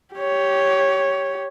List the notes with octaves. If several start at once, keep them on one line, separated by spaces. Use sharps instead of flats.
G4 C#5